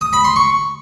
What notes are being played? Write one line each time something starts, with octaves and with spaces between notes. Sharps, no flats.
D#6
B5
C6
C#6